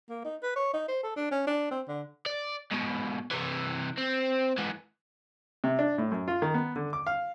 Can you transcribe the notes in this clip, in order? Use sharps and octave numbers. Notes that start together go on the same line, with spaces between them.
A#3
D#4
B4
C#5
D#4
C5
A4
D4
C#4
D4
C4
D3
D5
G#2 B2
C3 E3
C4
G#2 E3
C3
D4
A2
F#2
F4
D#3
B3
D3
D6
F5